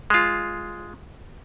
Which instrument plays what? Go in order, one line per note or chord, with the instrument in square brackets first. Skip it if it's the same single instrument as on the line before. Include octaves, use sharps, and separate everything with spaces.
[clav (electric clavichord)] G#3 F4